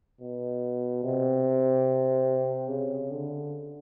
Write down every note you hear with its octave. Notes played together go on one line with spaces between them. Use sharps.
B2
C3
C#3
D3